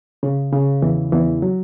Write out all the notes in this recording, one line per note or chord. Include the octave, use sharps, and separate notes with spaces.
C#3
C#3
E2 E3
E2 E3
F#3